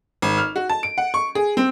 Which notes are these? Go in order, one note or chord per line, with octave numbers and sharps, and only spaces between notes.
G#1
F6
F#4
A5
D7
F#5
C#6
G#4
C4